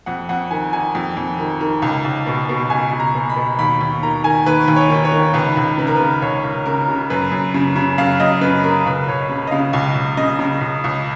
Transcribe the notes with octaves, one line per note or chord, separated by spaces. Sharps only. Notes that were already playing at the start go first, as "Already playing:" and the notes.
F2 F#5
F2 F#5
D#3 G#5
D#3 G#5
F2
F2
D#3
D#3
C#2
C#2
B2
B2
C#2 G#5
C#2
A#5
B2
B5
B2
D#2 B5
D#2
D#3 A#5
D#3 G#5
D#2 B4
D#2
C#5
D#3
C#5
D#3
C#2 B4
C#2
C#3 B4
A#4
C#3 B4
C#2 C#5
C#2
C#3 A#4
C#3
F#2 B4
F#2
C#3
C#3
F#2 F5
F#2 D#5
C#3 B4
C#3 A#4
C#2 B4
C#2 C#5
C#3
D#5
C#3 F5
C#2
C#2
C#3 D#5
C#3
C#2
C#2